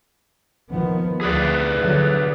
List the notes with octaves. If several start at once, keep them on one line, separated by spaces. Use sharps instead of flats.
D#3 F3 B3
D2 G#4 B4 D5
D3 F#3